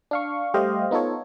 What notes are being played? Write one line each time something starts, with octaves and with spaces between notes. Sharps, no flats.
D4 F5 C#6
G3 A3 G4 C5 D#5 F5
B3 D#4 F4 A4 C#5